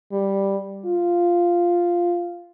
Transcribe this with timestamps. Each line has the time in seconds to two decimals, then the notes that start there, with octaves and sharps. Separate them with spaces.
0.12 G3
0.86 F4